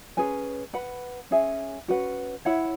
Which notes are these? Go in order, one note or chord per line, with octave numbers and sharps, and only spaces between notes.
C#4 G#4 B4 G#5
B4 F#5 B5
C#4 G#4 E5 G#5
C#4 F#4 B4 F#5
E4 C#5 F#5 B5